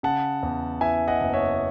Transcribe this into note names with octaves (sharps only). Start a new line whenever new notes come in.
C#3 F#5 A5
E2
E3 E5 G#5
D#5 F#5
F#1
C#5 E5